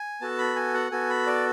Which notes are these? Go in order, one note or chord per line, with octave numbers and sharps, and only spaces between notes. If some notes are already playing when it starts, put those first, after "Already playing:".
Already playing: G#5
B3 F#4 A4 A5
B5
G#5
F#5
B3 F#4 A4 G#5
B5
D5